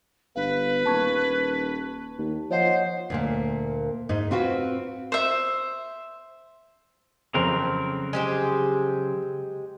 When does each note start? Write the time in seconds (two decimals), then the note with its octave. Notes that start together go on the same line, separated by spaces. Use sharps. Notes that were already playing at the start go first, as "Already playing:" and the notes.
0.36 G1 B4 F5
0.86 D#1 A5 C#6 G#6
2.18 D#2
2.51 F3 C5 C#5 D#5 F#5
3.10 D2 A#2 A#3
4.09 G#2 D#4
4.31 C4 F4 F#4 B4
5.12 C5 E5
7.34 F2 C#3 F#3 C4 A#4
8.13 G#3 G4 C5